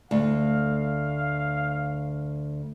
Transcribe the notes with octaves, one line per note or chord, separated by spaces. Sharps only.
D2 F5